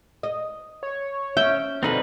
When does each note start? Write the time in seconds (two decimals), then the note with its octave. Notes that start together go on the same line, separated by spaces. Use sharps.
0.23 D#5
0.83 C#5
1.37 C#4 E5 G5
1.83 B2 D3 F3 C4 D#4 B4